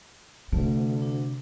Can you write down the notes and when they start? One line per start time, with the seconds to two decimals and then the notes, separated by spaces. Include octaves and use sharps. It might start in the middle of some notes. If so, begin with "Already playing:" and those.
0.53 D2 C3 A3
1.02 D4